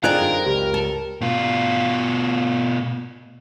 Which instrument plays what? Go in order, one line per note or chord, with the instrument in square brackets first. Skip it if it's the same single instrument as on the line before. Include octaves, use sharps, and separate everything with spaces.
[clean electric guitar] D3 D#4 F4 [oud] C4 G#4 D5 [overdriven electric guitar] A#4 [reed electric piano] F#6
[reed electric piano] F#2
[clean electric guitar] C#2 [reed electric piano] G4
[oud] A4
[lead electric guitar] B2 F4